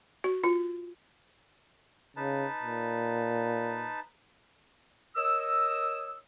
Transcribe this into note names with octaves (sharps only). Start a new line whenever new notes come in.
F#4
F4
C#3 D#4 B4 A5
A#2
A#4 C#5 D#5 D#6 E6